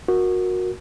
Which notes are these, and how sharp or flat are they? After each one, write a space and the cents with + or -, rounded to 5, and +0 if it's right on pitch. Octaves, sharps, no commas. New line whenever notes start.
F#4 -15 A#4 +0